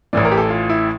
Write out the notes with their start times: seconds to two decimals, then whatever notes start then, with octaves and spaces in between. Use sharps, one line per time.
0.13 A1 A2 E3 D5
0.25 A#4
0.32 G4
0.38 A4
0.50 F4
0.70 E4